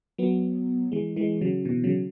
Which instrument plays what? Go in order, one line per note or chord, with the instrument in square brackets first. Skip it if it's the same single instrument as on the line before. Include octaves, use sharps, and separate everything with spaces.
[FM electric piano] F#3 B3
E3 G#3
E3 G#3
C#3 F#3
B2 E3
C#3 F#3